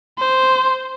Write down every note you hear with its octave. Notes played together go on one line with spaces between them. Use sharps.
C5